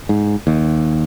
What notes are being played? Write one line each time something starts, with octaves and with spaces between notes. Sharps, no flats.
G#2
D#2